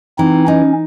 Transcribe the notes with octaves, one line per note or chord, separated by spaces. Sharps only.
E3 C4 D#4
C#4 D#4